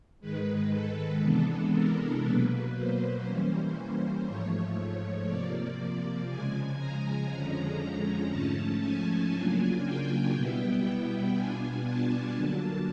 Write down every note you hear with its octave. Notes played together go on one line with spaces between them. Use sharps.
G#2 D#3 G#3 B4
A4
C3 E3 G#3 B3 D4
A#4
B2 F#3 A#3 B4
C5
E3 G3 A#3 C#4
G#2 F3 A3 C#5
C3 F3 A#3 D5
C#3 F3 G#3 G#5
A#5
F2 D3 F3 G#3 C#4
G#2 F3 A3 C#4 A5
G#5
C#3 F#3 A#3 D4 F4
G5
B2 G3 B3 E4 G5
B2 G3 B3 D4 F4 G#5
A5
D3 F#3 A#3